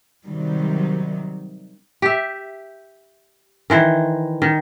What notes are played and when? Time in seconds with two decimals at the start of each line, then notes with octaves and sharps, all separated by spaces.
0.25 C3 D#3 F#3 G3
2.02 G4 E5
3.70 D#3 E3 C5
4.42 D#3